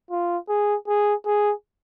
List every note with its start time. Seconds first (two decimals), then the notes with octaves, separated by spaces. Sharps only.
0.11 F4
0.49 G#4
0.88 G#4
1.26 G#4